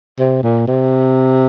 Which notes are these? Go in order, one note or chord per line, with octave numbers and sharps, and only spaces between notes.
C3
A#2
C3